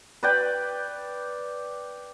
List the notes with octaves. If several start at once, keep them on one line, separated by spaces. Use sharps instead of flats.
B4 D5 G5